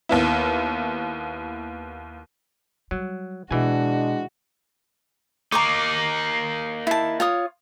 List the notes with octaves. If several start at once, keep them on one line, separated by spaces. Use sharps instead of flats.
D#2 B3 E4
F#3 G3
B2 E3 G#3 D4 F#4 G#5
A#3 D#4 A#5 C#6 D6
E4 A5
F4 C#5 D#6